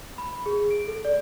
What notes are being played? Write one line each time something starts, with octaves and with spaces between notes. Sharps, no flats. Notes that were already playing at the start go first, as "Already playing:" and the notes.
B5
G#4
D7
A4
D5